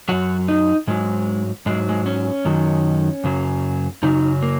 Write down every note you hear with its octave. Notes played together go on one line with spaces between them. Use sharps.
F#2 F#3 F#4
D#4
G#2 F#3 G#3
G#2 F#3 G#3
G#3
C#4
F#2 D#3 F#3
F#2 C#3 F#3
F#2 C#3 F#3 D#4
A#3